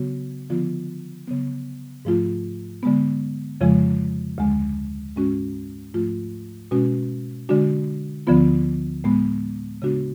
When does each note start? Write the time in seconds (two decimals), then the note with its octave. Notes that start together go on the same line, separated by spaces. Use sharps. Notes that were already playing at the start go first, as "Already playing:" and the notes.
Already playing: C#3 F#3 B3 F#4
0.50 D3 F3 B3 F4
1.27 C#3 F#3 B3
2.05 G#2 F3 A3 F4
2.83 D3 G#3 B3
3.61 F2 C#3 F3 G#3
4.38 D2 D3 G#3
5.16 G#2 G#3 C#4 F#4
5.93 G#2 F3 A3 F4
6.71 B2 G#3 C#4 F#4
7.49 D3 G#3 D4 F#4
8.27 D2 D3 F3 B3 F4
9.04 A2 G#3 B3
9.82 C#3 G#3 B3 D4 F#4